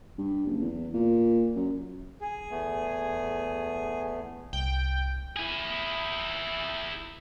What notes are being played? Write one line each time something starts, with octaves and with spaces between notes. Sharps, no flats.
G2
F#1
E2
A#2
F#2
G#4
E2 A3 B3
C2 G5
E4 G#4